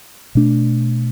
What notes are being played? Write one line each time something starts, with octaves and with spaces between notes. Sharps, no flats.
B2 A3 D4